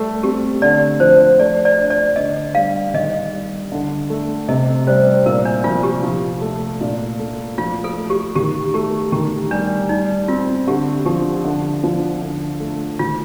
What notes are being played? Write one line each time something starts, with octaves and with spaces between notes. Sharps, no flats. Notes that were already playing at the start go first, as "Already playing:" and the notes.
Already playing: G3 A3
C4 G4
D3 D5
F3 C5
A3 D5
D5
D4
D5
D3 D#5
G3 F5
D#3 D#5
G3
D3
A3
C3 D#5
G3 C5
A#2 A#4
D4
F3 F4
G4
F3
A3
A#2
A3
F3 F4
A4
A3
G4
D#3 G4
A3 G4
D#3 G4
G3 D4
G3 D#4
C4 F4
D3 G4
F3 G4
D3
F3
D3
A3
D#3 F4